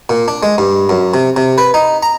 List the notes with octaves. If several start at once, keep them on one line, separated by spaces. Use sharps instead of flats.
A#2
D4
G#3
G2
F#2
C3
C3
B4
D#4
A#5